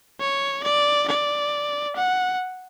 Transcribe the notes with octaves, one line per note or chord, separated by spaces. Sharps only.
C#5
D5
D5
F#5